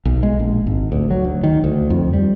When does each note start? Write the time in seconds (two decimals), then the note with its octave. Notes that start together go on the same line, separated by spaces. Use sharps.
0.05 B1
0.23 G#3
0.39 A#1
0.67 G#1
0.92 D2
1.11 F#3
1.25 D2
1.43 D#3
1.64 D2
1.90 F2
2.13 G3